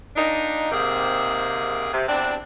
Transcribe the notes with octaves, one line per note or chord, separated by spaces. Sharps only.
A#2 D4 D#4
G#2 C3 A#3 C4 G#4
C3
E2 C4 D4